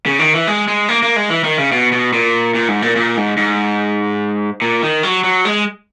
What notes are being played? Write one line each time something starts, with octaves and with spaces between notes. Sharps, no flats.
C#3
D#3
E3
G#3
G#3
A#3
A#3
G#3
E3
D#3
C#3
B2
B2
A#2
A#2
G#2
A#2
A#2
G#2
G#2
A#2
D#3
F#3
F#3
G#3